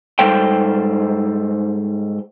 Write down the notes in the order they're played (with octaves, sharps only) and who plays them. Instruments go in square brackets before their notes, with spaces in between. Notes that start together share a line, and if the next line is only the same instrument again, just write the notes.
[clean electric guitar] G#2 G3 A4 C5 G5